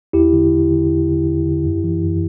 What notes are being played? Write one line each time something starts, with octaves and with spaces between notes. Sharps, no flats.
E2 E4 G4
D3
E2
D3
E2
D3
E2
D3
F#2
E3
F#2